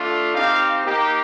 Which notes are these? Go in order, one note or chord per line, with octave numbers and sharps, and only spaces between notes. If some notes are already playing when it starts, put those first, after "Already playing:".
Already playing: A3 D4 F4
C4 D#4 G4 F5
A#3 D#4 G4